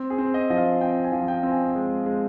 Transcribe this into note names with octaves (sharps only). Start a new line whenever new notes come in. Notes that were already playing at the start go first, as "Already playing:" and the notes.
Already playing: C4
G#4
C4
D#5
F3 D#5
F5
C4 G5
G#5
F3
G5
C4
G#5
G#3
G#3